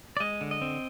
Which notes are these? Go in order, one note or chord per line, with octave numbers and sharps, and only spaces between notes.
D5
G#3 D#5
D3
D#5
C4